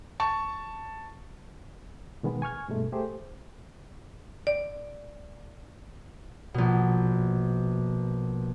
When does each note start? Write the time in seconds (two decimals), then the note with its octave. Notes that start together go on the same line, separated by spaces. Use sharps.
0.20 A5 C#6
2.23 B2 D#3 G#3 B3
2.42 G#5 C#6 F6 G#6
2.68 G2 B2 G#3 A3
2.92 A3 G4 G#4 C5
4.47 D5
6.54 A#1 B2